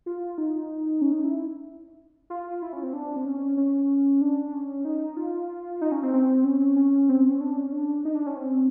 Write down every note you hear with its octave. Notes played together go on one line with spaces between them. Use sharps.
F4
D#4
C#4
D#4
E4
F4
E4
C#4
C4
D4
C4
C#4
C#4
D4
C#4
D#4
F4
D#4
C#4
C4
C4
C#4
C#4
C4
C4
C#4
D4
C#4
D4
D#4
D4
C#4
C4